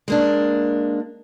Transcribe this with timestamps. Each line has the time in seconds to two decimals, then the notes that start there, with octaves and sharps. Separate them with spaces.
0.08 G#3 A#3 D4